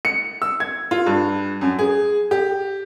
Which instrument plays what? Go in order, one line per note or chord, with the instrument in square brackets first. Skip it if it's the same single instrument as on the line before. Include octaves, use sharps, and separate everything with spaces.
[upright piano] C#7
E6
G#6
F4
G2
F#2
G#4
G4